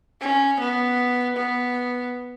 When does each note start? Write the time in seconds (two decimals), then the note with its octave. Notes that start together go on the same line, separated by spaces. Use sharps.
0.21 C#4
0.59 B3
1.36 B3